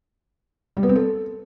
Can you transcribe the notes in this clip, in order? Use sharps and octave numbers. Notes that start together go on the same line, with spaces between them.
G3
B3
C4
A4